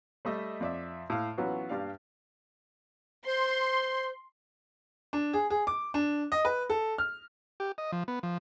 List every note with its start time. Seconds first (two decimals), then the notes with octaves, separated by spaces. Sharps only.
0.25 G3 A3 D#5 E5
0.60 F2 D5 E5
1.10 A2 F5
1.38 E3 F#3 B3 C#4 F4 F#4
1.69 G2 G4 D5 F5
3.26 C5 C6
5.13 D4
5.33 G#4
5.50 G#4
5.67 D6
5.94 D4
6.32 D#5
6.45 B4
6.70 A4
6.98 F6
7.60 G4
7.78 D#5
7.92 F3
8.08 B3
8.23 F3